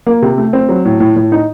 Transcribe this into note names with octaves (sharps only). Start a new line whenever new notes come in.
A#3
C3
A3
C4
F#3
A2
A2
A2
D#4